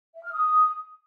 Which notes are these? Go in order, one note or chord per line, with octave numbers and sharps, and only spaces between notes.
E5
F6
D#6